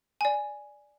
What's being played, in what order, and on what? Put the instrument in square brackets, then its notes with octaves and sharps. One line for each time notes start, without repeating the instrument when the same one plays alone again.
[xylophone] D5 G#5